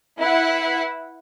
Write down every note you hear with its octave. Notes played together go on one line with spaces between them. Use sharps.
E4 B4 F#5